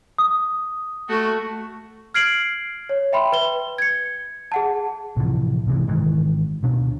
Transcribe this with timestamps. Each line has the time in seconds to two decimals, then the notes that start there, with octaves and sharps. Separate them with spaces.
0.18 D#6
1.09 A3 F#4
2.14 F6 G#6 C7 D7 F#7
2.89 C#5
3.13 E5 G5 B5 C6
3.32 B4 G7
3.78 G#6 C#7
4.52 G#4 F#5 A5
5.17 A2 C3 E3 F3
5.66 G#2 C3 E3
5.87 G#2 D#3 E3
6.63 D2 B2 D4